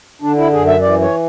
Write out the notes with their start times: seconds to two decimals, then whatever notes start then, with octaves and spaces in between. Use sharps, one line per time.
0.22 D3 D4
0.37 E4
0.52 F#2 G#4
0.67 E5
0.81 E3 D5
1.02 C#5